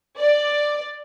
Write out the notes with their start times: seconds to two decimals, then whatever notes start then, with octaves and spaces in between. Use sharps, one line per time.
0.17 D5